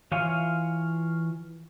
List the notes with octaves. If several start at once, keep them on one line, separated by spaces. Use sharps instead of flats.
E3 F4 C#5 F5 G#5